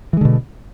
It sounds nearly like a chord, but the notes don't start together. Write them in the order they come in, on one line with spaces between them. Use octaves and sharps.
E3 G#3 D3 B2